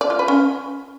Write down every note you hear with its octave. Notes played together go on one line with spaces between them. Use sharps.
D5
F4
B4
C#4